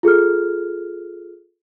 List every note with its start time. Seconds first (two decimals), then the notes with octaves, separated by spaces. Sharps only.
0.03 F4 G#4 A4 F6